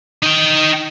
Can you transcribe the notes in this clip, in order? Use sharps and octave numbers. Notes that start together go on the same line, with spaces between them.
D#4 G5